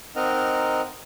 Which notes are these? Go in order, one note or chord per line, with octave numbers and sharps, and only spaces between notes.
C4 D#4 A#4 D#5 F#5 F6